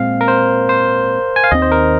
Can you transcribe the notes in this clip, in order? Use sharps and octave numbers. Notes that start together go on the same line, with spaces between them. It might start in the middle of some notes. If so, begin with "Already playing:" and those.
Already playing: A#2 G#3 C4 F5
A#4
C5
C5
G#5
F5
D#2 D#3 C4 D#5
C5
A#4